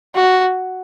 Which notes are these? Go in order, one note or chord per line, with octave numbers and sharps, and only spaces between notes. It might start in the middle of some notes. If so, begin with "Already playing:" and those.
F#4